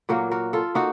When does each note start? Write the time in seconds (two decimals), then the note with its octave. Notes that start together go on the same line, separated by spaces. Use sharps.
0.09 A#2 F#3 A#3 F#4 A#4
0.31 F#4 A#4
0.53 F4 A4
0.75 A#3 D#4 F#4